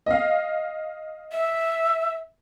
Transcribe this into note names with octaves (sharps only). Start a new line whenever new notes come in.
D#5 F5
E5